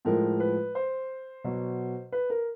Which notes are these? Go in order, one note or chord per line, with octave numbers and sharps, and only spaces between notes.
A2 F3 G#3 A#4
B4
C5
B2 F#3
B4
A#4